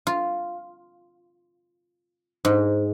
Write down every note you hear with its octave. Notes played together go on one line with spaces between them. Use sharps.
F4
G#2